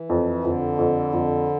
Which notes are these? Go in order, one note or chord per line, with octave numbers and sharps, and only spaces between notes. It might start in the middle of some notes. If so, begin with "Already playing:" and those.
Already playing: E3
F2
F2 D3
F2
F2